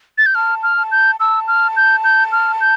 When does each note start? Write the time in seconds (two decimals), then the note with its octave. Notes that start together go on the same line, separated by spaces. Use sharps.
0.18 A6
0.26 G6
0.35 A5 F6
0.63 F6
0.77 A5
0.92 G6
1.20 A5 E6
1.48 F6
1.76 G6
2.04 G6
2.32 F6
2.61 G6